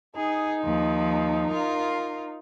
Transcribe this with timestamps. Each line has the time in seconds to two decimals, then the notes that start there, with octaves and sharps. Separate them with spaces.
0.16 D#4 G#4
0.64 D#2 F3
1.50 F4 A#4